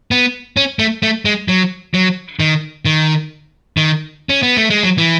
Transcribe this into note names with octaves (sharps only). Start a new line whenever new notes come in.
B3
C#4
A3
A3
G#3
F#3
F#3
D#3
D#3
D#3
C#4
B3
A3
G#3
F#3
E3